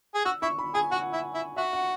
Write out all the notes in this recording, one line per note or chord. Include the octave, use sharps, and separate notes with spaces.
G#4
F#4 E6
E4 C#6
B5
G#4 G#5
F#4 F#5
E4
E4
F#4 E5
F#5